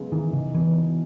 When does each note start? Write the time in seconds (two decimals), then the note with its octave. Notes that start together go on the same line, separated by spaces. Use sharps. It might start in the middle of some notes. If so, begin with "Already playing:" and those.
Already playing: C#3 F#3 G#3 B3
0.12 D#3 E3
0.33 C#3 D#4
0.55 B2 E3
0.77 B2